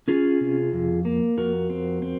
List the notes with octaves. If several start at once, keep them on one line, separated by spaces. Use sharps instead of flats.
C#4 F4 G#4
C3
F2
A#3
F2 F#4 A#4
C4
C4